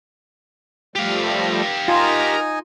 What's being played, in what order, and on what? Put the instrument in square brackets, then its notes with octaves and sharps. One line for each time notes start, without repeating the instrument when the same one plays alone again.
[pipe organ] F3 G3 A3 [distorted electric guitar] G4 F5
[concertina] D#4 D#5 G#5 [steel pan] F4 [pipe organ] A#4 A#5